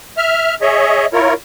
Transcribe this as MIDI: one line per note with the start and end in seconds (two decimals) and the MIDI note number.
0.18 0.55 76
0.18 0.55 89
0.62 1.06 68
0.62 1.06 73
0.62 1.06 75
0.62 1.06 76
1.13 1.34 64
1.13 1.34 65
1.13 1.34 70
1.13 1.34 73